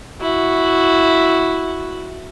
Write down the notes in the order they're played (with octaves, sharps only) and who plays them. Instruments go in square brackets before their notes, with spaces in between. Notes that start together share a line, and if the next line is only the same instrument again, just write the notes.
[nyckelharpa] E4 F#4